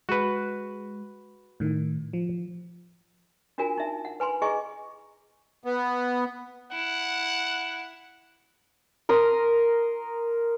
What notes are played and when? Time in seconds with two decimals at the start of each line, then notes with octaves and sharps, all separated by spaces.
0.09 G#3 F#4 B4
1.60 A2 D#3
2.13 F3
3.58 D4 F4 F#4 A#4 G#5
3.78 D#4 E5
4.05 F#5
4.20 B4 G#5 B5 C6
4.42 E4 G#4 D#5 G#5 C#6
5.64 B3
6.72 E4 F#5
9.09 A#4 C6 D#6